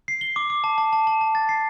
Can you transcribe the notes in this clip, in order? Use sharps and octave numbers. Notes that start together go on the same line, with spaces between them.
C7
G7
D6
D6
A5
A5
A5
A5
A5
A6
C7